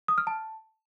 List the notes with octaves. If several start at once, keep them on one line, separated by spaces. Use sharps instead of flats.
D#6
F6
A5